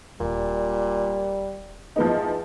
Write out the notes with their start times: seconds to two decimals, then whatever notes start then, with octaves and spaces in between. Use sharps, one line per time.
0.20 D#1 A#2 G3
1.96 E2 F3 B3 D#4